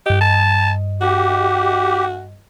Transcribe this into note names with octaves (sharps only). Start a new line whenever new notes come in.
G2 G4 D#5
A5
F#4 G4